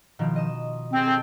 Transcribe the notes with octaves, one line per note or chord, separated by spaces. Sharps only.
B2 D#3 F3
D#5 E7
C4 G4 G#4
A4 G5